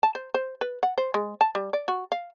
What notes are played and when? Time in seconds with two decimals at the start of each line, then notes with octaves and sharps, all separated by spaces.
0.03 A5
0.15 C5
0.34 C5
0.61 B4
0.83 F#5
0.98 C5
1.14 G#3
1.41 A5
1.55 G3
1.73 D5
1.88 F#4
2.12 F5